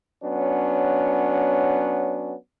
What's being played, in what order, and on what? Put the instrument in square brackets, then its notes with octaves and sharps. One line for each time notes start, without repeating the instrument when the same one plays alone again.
[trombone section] F#3 B3 C#4 D4